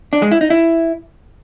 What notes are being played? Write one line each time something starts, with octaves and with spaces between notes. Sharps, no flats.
D4
G#3
E4
D#4
E4